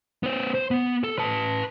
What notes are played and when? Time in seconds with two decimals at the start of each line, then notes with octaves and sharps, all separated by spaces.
0.23 B3 C5
0.55 C5
0.71 B3
1.04 A4
1.18 B4 A5